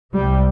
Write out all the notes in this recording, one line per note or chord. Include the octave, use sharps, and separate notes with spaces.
C2 C3 G3